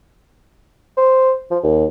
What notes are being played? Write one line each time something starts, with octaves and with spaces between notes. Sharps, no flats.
C5
F3
D#2